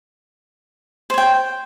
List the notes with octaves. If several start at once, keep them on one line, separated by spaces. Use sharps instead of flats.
C5 C#5 G5